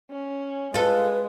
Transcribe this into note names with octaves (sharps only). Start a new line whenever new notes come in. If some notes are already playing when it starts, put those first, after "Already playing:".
C#4
G#3 F4 A4 B4